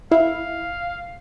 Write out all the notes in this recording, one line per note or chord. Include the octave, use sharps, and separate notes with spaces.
E4 F5